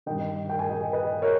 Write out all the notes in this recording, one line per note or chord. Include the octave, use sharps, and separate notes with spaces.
G2 D#3 D#5 G5
G5
G#5
D#5 G5
B4 D#5
A#4 C#5